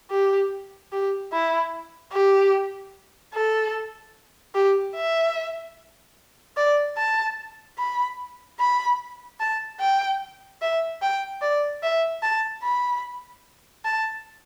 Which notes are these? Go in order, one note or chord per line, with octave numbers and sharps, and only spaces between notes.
G4
G4
E4
G4
A4
G4
E5
D5
A5
B5
B5
A5
G5
E5
G5
D5
E5
A5
B5
A5